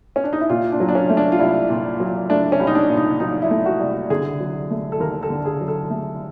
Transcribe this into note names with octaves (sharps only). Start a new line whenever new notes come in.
C#4
D4
D#4
E4
A#2 F4
D4
F#3
D4
C#4
A3
D4
F4
C2 E4
A#2
F#3
A3 D4
C#4
C2
D#4
D4
A#2
D#4
F#3 D#4
E4
A3
F#4
C2
D3 G#4
F#3
A3
A4
D#2 A#4
A4
D3
G#4
F#3
A4
A3